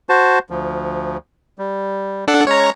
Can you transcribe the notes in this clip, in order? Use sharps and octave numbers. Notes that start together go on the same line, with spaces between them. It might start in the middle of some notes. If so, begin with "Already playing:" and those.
F#4 C5 A5
D2 F3
G3
D4 A4 F#5
G#3 C#4 C#5 A#5